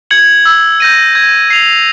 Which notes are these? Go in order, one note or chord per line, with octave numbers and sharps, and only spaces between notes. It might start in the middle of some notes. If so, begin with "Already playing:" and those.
G#6 C#7 F#7
E6
G6 A#6 D#7
G#6
C7 F7